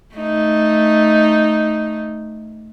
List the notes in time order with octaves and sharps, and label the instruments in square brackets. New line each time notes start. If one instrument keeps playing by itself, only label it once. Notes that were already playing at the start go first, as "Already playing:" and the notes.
[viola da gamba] A3 D#4